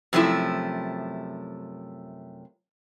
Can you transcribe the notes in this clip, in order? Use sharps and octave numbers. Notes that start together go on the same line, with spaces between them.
F#2 C3 F3 A3 E4